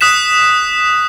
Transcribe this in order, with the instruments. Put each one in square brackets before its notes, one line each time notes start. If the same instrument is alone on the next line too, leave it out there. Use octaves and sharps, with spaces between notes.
[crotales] D#6 F#6 B6 E7